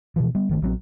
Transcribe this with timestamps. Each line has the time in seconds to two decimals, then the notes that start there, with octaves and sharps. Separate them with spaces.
0.16 B2 E3 F3
0.35 G3 B3
0.49 G1 D#3 A3
0.62 A#1 F#3 C4